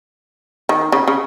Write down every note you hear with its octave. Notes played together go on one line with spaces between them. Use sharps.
D#3
C#3
C#3